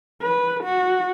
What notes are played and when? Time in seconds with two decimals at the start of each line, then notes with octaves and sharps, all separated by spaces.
0.23 B4
0.64 F#4